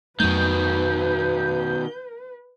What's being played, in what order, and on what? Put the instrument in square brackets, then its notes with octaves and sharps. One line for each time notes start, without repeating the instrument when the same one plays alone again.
[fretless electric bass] F2 F#3 A3 [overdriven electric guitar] B2 D#3 [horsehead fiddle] B4 [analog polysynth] G6